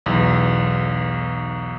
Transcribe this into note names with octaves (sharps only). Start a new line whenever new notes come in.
B1 E2